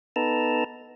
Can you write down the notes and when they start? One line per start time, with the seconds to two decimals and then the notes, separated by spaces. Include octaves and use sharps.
0.16 B3 D#4 A4 B4 A5 A#5